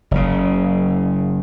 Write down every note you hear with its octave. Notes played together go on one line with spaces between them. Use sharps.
F#1 C#3